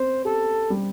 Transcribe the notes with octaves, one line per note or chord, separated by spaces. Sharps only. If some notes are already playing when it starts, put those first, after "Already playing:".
Already playing: C4 C5
G4 A4
G3